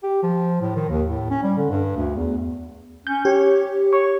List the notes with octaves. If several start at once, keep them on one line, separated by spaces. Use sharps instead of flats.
G4
F3
A2
D#3
D#2
A2
C#4
G3
D3
G2
D2
E2
C#4 G6
G4 C#5
C#5 C#6